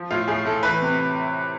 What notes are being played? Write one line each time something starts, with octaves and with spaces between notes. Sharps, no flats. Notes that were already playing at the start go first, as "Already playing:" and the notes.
Already playing: F3
A2 F4
A2 G#4
A2 A4
E3 B4
C3